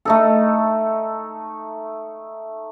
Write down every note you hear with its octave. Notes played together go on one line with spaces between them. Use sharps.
A3 D#4 A4